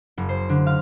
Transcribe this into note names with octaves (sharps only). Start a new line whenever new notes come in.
F#1
C5
D3
F5